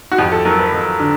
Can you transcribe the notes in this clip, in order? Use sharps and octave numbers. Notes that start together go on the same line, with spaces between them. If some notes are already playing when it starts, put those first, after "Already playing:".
F#4
F2 G4
A4
F#3 A#4
B4
F2
D3